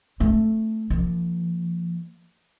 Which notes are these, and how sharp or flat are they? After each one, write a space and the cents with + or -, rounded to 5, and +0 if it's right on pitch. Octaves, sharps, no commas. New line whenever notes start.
A3 +0 C4 +0
F3 -25 A#3 -25